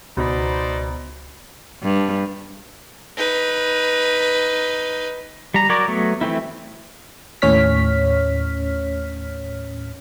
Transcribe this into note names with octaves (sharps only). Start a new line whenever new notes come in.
C#2 B2 D#4 C5 D5 A#5 B5
G2
D#4 B4
G3 A#5
F#3 A#4 C#5 D5
F#3 A3 B3
E3 A3 C4 E4
D#2 A2 C#4 C#5 F6 B6